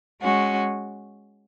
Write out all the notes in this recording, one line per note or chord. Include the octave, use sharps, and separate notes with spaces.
G#3 C#4 F#4